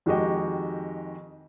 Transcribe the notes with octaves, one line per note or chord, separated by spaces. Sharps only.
F2 D#3 G#3 F#4 G4 D#5